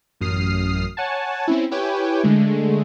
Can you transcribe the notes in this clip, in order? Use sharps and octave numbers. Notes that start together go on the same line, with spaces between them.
A1 F#2 D#6 F6 C7
C#5 F#5 G#5 A5
C4 C#4 E4
E4 G4 B4 C#5 G5 G#5
D3 G#3 A3